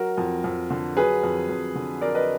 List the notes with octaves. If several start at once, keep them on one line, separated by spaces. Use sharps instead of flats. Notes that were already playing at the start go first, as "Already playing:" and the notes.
Already playing: F#3 F#4 A#4
F2
F2
D3
F#3 G#4 B4
F2
F2
D3
F#3 A#4 D5
B4 D#5